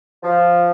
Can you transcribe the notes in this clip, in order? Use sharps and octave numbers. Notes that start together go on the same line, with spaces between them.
F3